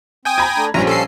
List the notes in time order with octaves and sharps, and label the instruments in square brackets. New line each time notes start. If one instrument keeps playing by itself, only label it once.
[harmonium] C4 [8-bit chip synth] G5 G#5 D#6
[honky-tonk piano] A#5 B5 G#6
[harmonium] A3 D4
[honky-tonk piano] A#1 A#2 [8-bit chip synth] G2 A#5 [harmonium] F3 G3 C#4
[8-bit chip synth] A4 C7